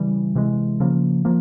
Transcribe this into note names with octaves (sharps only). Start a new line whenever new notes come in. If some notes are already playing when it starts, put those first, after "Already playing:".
Already playing: C#3 E3 G3
C3 E3 G#3
C#3 F3 A#3
F3 A#3